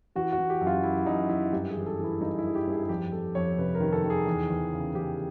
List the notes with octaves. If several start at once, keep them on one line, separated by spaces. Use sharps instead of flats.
E3 F#4
F#4
E3
G4
F#2
F4
F#2 E4
F#2 D#4
F#2 E4
G2 G4
G#4
E3
A4
E3
E4
G2 D#4
E4
E3 G#4
G4
G2 G#4
G#4
F2 G4
F2 A4
F2 C#5
C3 B4
A#4
D#3
A4
D#3
G#4
E2
E2
C#3
E2 G4